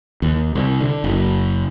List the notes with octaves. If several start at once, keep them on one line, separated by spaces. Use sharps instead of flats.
D#2
C2
D3
F#1